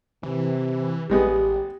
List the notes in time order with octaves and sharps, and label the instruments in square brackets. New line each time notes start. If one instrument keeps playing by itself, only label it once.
[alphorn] C3 [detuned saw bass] E3
[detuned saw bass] A1 [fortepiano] G3 G#3 B3 [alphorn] G4